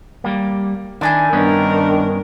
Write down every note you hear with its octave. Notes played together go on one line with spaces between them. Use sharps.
G3 A#3
D#3 D4 E4 G#5 G6
G2 D#3 B3 C#4 D4 A#4